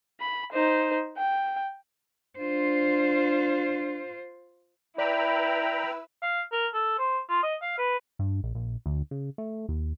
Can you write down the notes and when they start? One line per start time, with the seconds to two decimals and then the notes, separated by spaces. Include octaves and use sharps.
0.20 B5
0.52 D#4 C5
1.18 G5
2.39 D4 F4 C5
4.98 E4 B4 D5 G5 A#5 B5 E6
6.22 F5
6.52 A#4
6.74 A4
6.99 C5
7.29 F4
7.43 D#5
7.62 F5
7.79 B4
8.19 G2
8.43 A#1
8.55 A#1
8.86 D2
9.11 C#3
9.38 A3
9.69 D#2